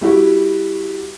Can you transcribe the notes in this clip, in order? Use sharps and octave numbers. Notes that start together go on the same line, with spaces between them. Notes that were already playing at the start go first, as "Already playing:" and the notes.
G3 E4 F#4 G4